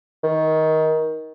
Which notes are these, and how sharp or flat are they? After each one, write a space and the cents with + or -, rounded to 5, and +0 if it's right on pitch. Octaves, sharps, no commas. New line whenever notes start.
D#3 +20